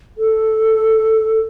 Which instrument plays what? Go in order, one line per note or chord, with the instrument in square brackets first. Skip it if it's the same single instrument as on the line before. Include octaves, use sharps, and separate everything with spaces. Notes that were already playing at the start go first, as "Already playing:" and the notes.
[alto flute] A4